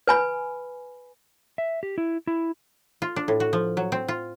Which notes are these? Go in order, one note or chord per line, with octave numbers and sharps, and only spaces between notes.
B4 G#5 B5
E5
G4
E4
E4
F4
D4
A2
F#4
F3
F#3
C4
F4